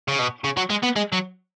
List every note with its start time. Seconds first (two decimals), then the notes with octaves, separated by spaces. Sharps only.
0.08 C#3
0.19 B2
0.44 C#3
0.57 F#3
0.70 G#3
0.83 B3
0.96 G#3
1.13 F#3